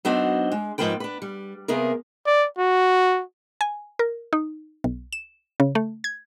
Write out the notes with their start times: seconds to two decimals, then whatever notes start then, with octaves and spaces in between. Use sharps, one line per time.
0.05 F#3 B3 D4 D#4 F#4 C5
0.52 G#3
0.78 G#2 E3 F3 A#3 B4 G5
1.00 D4 B4
1.22 G3
1.68 C3 A#3 B3 G#4 A#4
2.26 D5
2.58 F#4
3.61 G#5
3.99 A#4
4.33 D#4
4.84 B1
5.13 E7
5.60 C#3
5.75 A3
6.04 G#6